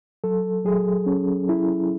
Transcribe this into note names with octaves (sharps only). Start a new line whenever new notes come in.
F#3 A4
F#3 G#4
C#4
E4